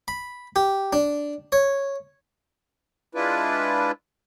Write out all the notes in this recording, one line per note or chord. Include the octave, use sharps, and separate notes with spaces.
B5
G4
D4
C#5
G#3 D4 E4 F4 B4